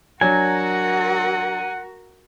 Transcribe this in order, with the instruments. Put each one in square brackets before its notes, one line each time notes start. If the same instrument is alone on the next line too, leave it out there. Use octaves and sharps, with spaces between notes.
[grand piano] F#3 D4 [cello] F#4 A#4 [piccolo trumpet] F#5 [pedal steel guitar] G#5